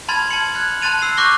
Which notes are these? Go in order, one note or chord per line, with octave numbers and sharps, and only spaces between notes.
A5 B5 C6 F6 G#6 A6
A5 B5 G#6 C#7 F#7
F#6 G#6
A5 C6 F#6 A6 D#7 F7
E6 C7
C#6 D6 F#6 G6 A#6 G7